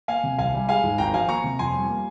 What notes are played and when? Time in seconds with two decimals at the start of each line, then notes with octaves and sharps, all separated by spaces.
0.08 A#3 F5 G#5
0.23 C3
0.38 C2 F5 G#5
0.54 G3
0.69 G#3 F5 G#5
0.84 G#2
0.98 G#1 G5 A#5
1.14 F3 F5 G#5
1.29 A#3 A#5 C#6
1.44 C3
1.59 F2 G#5 C6
1.74 G3
1.89 A#3